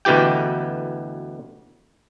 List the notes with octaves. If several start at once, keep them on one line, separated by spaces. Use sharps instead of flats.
D2 B2 E3 G4 G5